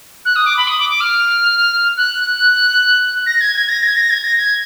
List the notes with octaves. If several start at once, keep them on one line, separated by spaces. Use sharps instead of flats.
F#6
D#6
D6
B5
D#6
D6
D6
F6
F#6
A#6
G#6
G#6
A#6
G#6
A#6
G#6
A#6
G#6